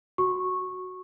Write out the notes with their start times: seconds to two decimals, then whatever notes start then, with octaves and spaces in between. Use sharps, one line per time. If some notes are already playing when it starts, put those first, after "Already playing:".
0.18 F#4 C#6